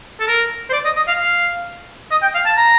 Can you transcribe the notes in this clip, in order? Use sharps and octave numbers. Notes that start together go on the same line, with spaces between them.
A4
A#4
C5
D5
D#5
D#5
F5
F5
D#5
G5
F5
A5
A#5